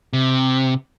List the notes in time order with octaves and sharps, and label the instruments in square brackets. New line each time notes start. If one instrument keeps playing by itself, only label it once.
[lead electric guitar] C3